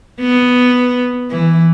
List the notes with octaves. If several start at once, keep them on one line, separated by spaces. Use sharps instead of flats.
B3
E3